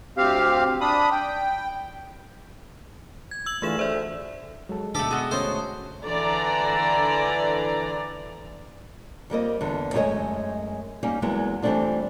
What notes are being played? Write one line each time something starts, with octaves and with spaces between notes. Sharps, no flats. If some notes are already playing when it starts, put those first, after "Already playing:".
D2 C4 G4 F5
D4 B5 D#6
G5
G#6
E6 F#7
D3 E3 A3 F4 G#4 E7
D2 C5 D5 E5
F#3 G#3 A4
D2 B2 A3 D4 G4 A4
B3 D4 F#4 G#4 D#5 D#6
D3 A3 C#4 C5 C#5 E5
D3 E3 D5 A#5
F2 G3 A#3 D#5
E2 D3
F#2 G#3 A3 F#4 C#5 D#5
G3 A#3 C#4 D#4
E2 F#3 G#3 A#3 B3 E4
E3 G3 A3 C4 D4 F4